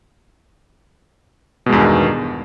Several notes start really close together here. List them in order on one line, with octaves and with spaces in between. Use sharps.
B2 G#3 E2 G2 D#3